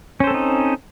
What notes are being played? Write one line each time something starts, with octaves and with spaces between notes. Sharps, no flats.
C4 C#4 D#4 A4 C5